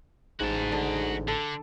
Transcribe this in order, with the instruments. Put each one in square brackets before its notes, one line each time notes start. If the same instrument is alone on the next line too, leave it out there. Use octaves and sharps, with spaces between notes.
[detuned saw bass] A1 [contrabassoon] G#2 [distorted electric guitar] F#4 A5 [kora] C#5
[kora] D3
[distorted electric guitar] D3 [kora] A4